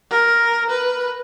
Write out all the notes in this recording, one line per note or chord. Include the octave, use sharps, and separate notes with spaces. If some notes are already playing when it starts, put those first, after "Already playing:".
A#4
B4